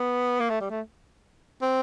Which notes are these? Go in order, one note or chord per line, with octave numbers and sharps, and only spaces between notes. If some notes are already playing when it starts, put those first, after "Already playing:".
Already playing: B3
A#3
A3
G3
A3
C4